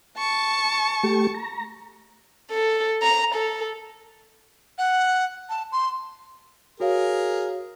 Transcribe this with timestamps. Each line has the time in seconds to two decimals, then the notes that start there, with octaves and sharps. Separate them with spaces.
0.18 A5 C#6
1.03 A3 G4
1.35 A#5
2.51 A4
3.02 A#5
3.35 A4
4.78 F#5
5.49 A5
5.72 C6
6.80 F#4 G#4 A#4 C#5 F5